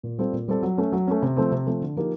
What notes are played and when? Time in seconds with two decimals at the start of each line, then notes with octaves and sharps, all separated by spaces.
0.03 A#2
0.18 G3 C4 F4 A4
0.33 A#2
0.48 G3 C4 F4 A4
0.63 F#3
0.78 A3 C#4
0.92 F#3
1.07 A3 C#4
1.22 C3
1.37 F3 A3 C4
1.51 C3
1.67 F3 A3 C4
1.81 D3
1.96 F3 A#3 D#4 G4